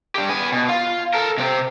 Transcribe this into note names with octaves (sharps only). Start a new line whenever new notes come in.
D4 G4
B3 G#5
B2
F4
A4 A#4
C3 C4